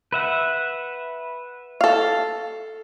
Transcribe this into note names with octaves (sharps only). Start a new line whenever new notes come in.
B4 E5 F#5
A4 F5